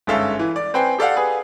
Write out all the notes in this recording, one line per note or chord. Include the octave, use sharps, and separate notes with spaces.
G1 G#2 C#4 A4 E5 F5
E3
D5
C4 B4 G5 G#5 C7
G4 A4 D5 F5 F#5
G#4 B4